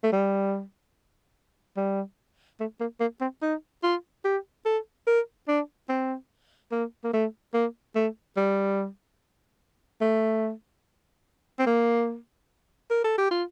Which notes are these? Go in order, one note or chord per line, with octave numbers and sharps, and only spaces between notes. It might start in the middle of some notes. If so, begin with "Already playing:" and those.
A3
G3
G3
A3
A#3
A#3
C4
D#4
F4
G4
A4
A#4
D4
C4
A#3
A#3
A3
A#3
A3
G3
A3
C4
A#3
A#4
A4
G4
F4